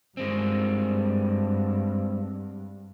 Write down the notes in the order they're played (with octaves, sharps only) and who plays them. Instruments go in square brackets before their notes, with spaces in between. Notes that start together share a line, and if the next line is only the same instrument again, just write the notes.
[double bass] G2 [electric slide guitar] G#3 C4